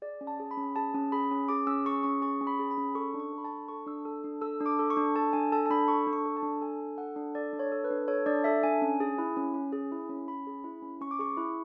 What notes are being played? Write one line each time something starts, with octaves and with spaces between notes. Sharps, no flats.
G#4 D5
C#4
A5
G#4
B5
C#4
G#4 A5
C#4
G#4 B5
C#4
G#4 D6
C#4 E6
G#4 C#6
C#4 C#6
G#4 C#6
C#4
B5
G#4
B5
C#4
A4 C#6
D4
C#6
A4
B5
A5
D4
A4 C#6
D4 E6
A4
D4
A4 E6
D4
D6
A4
C#6
D4
A4 A5
D4 G#5
A4 A5
A5
D4 B5
A4 C#6
D4
C#6
A4
A5
D4
A4 G#5
D4
A4 F#5
D4
A4 D5
D4
C#5
A4
B4
D4
A4 C#5
D4 D5
A4 E5
D4 G#5
C#4
G#4
E4
C#4
C#4
G#4
E4
C#4
C#4 B5
G#4
E4
C#4
C#4 C#6
D6
G#4 C#6
E4